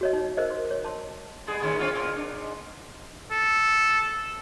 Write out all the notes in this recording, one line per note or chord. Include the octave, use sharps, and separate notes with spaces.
F#4 C#5 D#5
D#4
A#4 C5 D#5
C6
C#5
A5 C6
G3 B3 G#4
A2 D#3 C#4
C4 D4 F4
A#2 B3 A#4
D4
G#2
A4